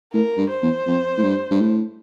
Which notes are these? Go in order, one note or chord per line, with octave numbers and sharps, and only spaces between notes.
A2 A#4
G2
C5
E2
F2
A2
G2
G2
A2